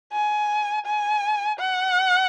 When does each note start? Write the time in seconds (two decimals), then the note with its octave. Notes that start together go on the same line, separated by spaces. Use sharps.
0.12 G#5
0.86 G#5
1.59 F#5